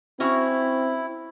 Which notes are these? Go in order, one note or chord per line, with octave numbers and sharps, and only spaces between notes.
C4 C#4 E4 F#4 E5